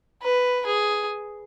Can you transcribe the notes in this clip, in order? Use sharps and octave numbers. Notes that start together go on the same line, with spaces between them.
B4
G#4